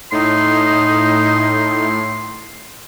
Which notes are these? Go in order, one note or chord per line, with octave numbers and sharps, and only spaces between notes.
A2 D#4 C6